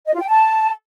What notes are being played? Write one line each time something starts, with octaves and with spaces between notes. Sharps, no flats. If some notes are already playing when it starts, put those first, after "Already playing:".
D#5
F4
G5
A5